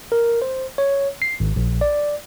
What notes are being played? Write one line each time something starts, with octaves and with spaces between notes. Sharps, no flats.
A#4
C5
C#5
C7
G#1
A#1
D5